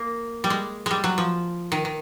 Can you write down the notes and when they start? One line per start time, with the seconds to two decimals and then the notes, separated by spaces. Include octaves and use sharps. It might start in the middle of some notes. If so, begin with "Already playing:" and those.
Already playing: A#3
0.44 G3
0.50 G#3
0.86 G3 G#3
1.04 F#3
1.18 F3
1.72 D#3
1.85 D#3